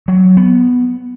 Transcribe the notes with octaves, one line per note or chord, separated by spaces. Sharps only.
F#3
B3